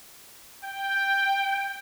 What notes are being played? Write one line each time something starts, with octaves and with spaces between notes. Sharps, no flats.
G5